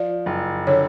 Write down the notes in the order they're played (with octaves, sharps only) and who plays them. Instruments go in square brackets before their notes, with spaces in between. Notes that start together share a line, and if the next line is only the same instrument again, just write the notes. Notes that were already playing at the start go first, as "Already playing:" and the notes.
Already playing: [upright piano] F3 [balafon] D5
[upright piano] F#1
[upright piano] D3 [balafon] C#5